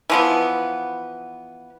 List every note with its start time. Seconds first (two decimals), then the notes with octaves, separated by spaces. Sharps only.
0.10 E3 F3 B3